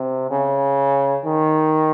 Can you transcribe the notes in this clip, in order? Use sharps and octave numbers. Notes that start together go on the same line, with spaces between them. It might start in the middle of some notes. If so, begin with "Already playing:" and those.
Already playing: C3
C#3
D#3